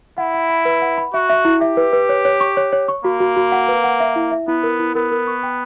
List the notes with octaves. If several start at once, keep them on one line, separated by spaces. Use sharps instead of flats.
E4 F#5
F#5
B5
B4
F#5
B5
F#4 E5
E5
E4
G4 E5
B4
B4
C#5
C#5
C#6
C#5
C#5
C#6
A#3 F#4
F#4
F#4
F#5
B4
F#5
E5
E4
E5
B3 E4
A#4
E4
B3 A#4
A#4
C#6
G5